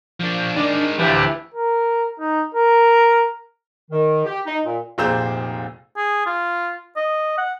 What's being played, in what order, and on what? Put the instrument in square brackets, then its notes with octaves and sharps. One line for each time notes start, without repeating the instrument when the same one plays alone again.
[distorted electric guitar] F3 D4
[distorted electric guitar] D#3 G#3 [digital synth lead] D4
[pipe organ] D2 A2 [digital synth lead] E3 [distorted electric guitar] F3 [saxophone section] D4 E4 G4
[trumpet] A#4
D#4
A#4
[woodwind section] D#3
G4
D#4
A#2
[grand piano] F1 A#2 G#4 C5 E6 E7
[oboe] G#4
F4
D#5
F#5